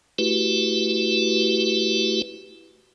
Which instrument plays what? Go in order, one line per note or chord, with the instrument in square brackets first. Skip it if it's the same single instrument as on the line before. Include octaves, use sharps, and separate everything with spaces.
[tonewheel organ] A3 E4 F#4 G4 B4